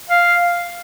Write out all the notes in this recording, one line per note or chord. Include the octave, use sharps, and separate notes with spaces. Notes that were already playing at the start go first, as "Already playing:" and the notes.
F5